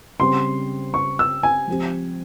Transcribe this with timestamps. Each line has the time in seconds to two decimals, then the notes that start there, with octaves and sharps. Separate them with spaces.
0.19 C#3 G3 C4 C6
0.94 C#6
1.19 E6
1.43 G#5
1.67 F3 C4 G4